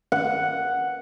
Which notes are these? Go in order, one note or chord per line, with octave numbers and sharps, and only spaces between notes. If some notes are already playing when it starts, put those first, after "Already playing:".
F#5